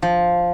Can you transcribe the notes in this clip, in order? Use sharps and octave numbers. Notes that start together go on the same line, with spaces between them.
F3